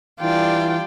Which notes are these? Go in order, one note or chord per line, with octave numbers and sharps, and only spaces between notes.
E3 G3 D4 F4 D5 G5